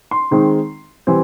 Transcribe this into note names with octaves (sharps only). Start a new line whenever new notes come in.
C6
D#3 G#3 C4 D#4
E3 G3 C4